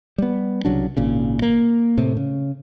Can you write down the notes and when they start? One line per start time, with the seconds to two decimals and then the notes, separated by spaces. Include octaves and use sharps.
0.18 G3 B3
0.65 C2 C#3 F#3 D4
0.97 G#1 A#2 C#3
1.42 A#3
1.97 A2 C3
2.17 C#3